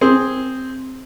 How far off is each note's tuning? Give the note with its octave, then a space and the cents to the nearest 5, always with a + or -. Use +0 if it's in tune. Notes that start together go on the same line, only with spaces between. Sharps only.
C4 +0 G#4 +0